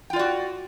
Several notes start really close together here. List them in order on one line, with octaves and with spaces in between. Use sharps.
G5 F4 D5 F#4